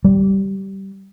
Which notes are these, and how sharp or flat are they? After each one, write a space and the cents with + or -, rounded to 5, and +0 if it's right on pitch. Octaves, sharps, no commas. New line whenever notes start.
G3 -15